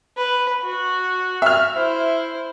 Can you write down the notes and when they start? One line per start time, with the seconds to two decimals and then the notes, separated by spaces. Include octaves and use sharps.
0.17 B4
0.63 F#4
1.42 E5 F6
1.75 E4 C5